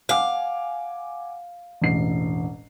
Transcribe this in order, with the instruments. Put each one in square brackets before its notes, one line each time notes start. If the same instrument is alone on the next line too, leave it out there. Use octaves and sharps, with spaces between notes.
[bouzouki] F5 [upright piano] F#5 G#5 D6
[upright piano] E1 A1 C7